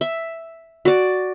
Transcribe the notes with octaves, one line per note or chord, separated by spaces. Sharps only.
E5
F#4 D5